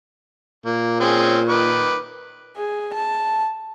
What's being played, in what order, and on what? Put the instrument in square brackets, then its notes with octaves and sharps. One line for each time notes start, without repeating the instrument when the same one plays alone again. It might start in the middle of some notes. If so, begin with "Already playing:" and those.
[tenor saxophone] A#2 [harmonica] A#3
[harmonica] C4 C#4 G#4
D#3 B4 D6
[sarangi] G#4
A5